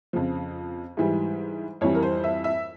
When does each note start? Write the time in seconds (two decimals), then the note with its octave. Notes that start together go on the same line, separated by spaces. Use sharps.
0.13 F2 C#3 F3
0.97 G#2 E3 G3
1.81 F2 E3 G3 C#5
1.95 A#4
2.03 C5
2.24 E5
2.44 E5